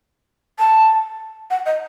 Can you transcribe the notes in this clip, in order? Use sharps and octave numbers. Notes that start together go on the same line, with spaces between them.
A5
F#5
D#5